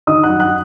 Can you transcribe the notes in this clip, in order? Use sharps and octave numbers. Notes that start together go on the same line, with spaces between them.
D#3 D#5 D#6
F#5 F#6
F#2
F#5 F#6